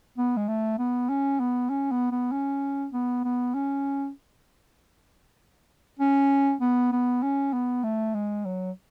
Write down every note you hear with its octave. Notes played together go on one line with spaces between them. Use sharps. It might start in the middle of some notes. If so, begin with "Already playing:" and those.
B3
G#3
A3
B3
C#4
B3
C#4
B3
B3
C#4
B3
B3
C#4
C#4
B3
B3
C#4
B3
A3
G#3
F#3